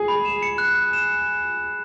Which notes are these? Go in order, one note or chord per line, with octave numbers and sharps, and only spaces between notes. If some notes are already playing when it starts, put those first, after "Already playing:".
Already playing: G#4
B5
E7
C#7
F#6
F#6
E7
C#7